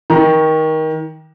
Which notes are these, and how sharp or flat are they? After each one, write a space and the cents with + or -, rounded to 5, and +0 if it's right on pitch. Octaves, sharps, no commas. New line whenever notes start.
D#3 +20 A#5 +20